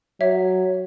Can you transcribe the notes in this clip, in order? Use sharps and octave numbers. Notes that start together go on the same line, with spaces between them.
F#3 C#5 E5